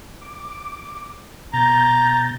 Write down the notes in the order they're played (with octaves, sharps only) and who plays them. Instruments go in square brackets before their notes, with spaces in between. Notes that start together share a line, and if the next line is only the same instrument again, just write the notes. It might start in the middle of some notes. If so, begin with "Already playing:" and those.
[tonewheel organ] D6
[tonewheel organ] B2 G6 A6 [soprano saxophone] A#5